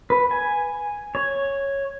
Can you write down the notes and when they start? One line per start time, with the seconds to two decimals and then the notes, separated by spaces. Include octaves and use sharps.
0.10 B4
0.31 G#5
1.15 C#5